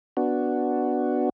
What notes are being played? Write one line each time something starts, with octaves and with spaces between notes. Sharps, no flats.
B3 D4 F#4